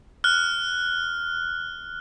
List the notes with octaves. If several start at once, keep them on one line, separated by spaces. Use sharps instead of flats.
F6 F#6